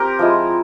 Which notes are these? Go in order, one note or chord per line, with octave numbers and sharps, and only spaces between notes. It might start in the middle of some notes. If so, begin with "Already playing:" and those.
Already playing: C4 G4 A#4
F3 G#3 E4